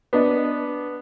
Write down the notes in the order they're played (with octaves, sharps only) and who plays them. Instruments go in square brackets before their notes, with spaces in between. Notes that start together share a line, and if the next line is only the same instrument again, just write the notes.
[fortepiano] B3 D4 D#5